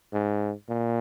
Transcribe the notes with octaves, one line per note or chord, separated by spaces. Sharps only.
G#2
A#2